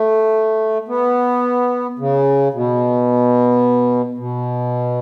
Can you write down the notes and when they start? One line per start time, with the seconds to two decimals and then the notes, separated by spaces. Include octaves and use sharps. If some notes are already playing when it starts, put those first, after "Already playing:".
Already playing: A3
0.88 B3
1.99 C#3
2.54 B2
4.18 B2